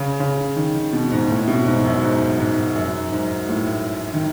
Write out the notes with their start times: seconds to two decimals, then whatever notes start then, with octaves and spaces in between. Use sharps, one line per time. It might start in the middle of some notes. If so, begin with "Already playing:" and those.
Already playing: C#3
0.20 C#3
0.56 D#3
0.75 D#3
0.93 B2
1.11 G#2
1.30 A2
1.47 B2
1.66 G#2
1.84 F#2
2.02 G#2
2.39 G#2
2.76 F#2
3.12 G#2
3.49 A2
4.14 D#3